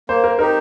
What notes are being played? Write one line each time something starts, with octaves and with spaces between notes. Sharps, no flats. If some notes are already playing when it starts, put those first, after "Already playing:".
A#3 C5
A#4
D#4 G4 A#4